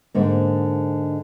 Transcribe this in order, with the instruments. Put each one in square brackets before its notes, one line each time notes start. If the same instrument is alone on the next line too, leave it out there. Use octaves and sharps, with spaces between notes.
[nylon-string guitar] G#2 D3 A#3